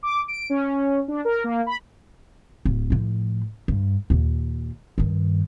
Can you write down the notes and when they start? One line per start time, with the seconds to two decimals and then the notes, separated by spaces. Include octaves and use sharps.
0.03 D6
0.28 D7
0.50 C#4
1.08 D4
1.25 A#4
1.44 A#3
1.67 B5
2.65 D1
2.90 A2 F3
3.68 G2
4.10 D#2 A#2
4.98 G2 D#3